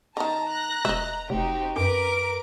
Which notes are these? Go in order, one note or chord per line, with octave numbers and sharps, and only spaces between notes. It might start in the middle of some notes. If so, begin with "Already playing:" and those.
D3 D#3 A5 A#5
F#6 A#6
E1 D#5 E5
F1 C4 D#4 F#4 G4
F#2 A#4 B4 D6 D7